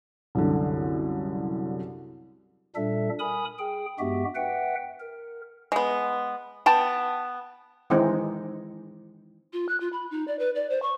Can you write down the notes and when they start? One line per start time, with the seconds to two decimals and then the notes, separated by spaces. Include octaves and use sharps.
0.35 C2 F#2 D3
2.76 A#2 G3 D4 A4 E5
3.19 A#4 G#5 B5 D#6
3.58 G#4 G5
3.99 G2 G#3 B3 F#4 G4 E5
4.35 B4 E5 F#5 G5
5.00 A#4
5.72 G#3 B3
6.66 B3 G5 A5
7.90 D#3 E3 G#3 C4 D#4
9.53 F4
9.69 F#6
9.80 F4
9.93 B5
10.11 D#4
10.28 D5
10.39 B4
10.55 D5
10.70 C5
10.82 C#6